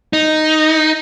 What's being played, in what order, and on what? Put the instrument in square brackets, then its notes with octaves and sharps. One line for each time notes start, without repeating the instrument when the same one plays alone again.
[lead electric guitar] D#4